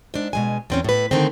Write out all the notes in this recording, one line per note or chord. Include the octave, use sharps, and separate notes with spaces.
G#2 D4
B2 G#3 G#5
E2 C4 C#4
A2 B4
D3 D#3 A3 C4